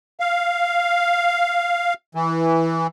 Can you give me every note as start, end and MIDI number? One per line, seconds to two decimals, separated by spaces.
0.20 1.94 77
2.15 2.87 52